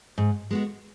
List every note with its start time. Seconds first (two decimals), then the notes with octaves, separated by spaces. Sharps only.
0.18 G#2
0.51 G#3 B3 F#4